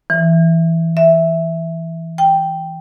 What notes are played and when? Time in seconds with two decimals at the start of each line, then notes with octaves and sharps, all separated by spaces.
0.10 E3
0.97 E5
2.18 G5